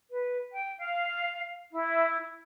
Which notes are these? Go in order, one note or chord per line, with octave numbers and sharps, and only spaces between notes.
B4
G5
F5
E4